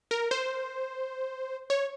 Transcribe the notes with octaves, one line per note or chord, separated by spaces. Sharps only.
A#4
C5
C#5